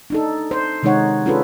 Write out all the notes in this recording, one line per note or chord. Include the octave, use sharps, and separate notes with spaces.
D4 D#4 A4
C5
C3 D#3 G#3 D#4 C#5 F#5
C#4 D4 F4 G#4 A4 B4